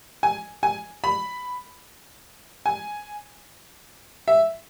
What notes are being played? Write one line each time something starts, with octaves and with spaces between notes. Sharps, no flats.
G#5
G#5
B5
G#5
E5